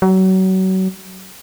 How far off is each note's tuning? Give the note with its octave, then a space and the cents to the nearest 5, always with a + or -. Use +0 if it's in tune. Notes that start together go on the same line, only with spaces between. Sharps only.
F#3 +30